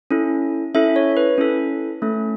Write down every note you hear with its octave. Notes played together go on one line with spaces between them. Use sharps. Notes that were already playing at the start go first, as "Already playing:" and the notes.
C#4 E4 A4
C#4 E4 A4 E5
C#5
B4
C#4 E4 A4
A3 C#4 A4